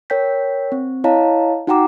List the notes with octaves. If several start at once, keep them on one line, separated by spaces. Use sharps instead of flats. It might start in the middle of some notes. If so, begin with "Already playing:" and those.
A#4 C#5 G5 G6 B6
C4
E4 C#5 D#5 F5 A5 A#5
D#4 F#4 F#5 G5 A#5 D6